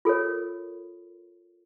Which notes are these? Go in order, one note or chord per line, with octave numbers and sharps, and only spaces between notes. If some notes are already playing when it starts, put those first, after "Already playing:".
F4 A4 A#4 C#5